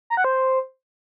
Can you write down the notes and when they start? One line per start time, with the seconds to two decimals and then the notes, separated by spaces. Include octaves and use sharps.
0.10 A#5
0.17 F#5
0.24 C5